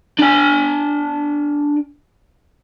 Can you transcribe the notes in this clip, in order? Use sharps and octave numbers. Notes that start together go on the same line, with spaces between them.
D4 G#5